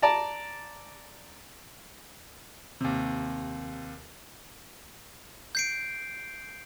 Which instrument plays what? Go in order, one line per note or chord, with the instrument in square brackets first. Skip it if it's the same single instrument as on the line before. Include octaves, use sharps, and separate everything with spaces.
[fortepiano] D5 A5 A#5
[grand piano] D#2 C3
[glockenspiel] G6 C7 D7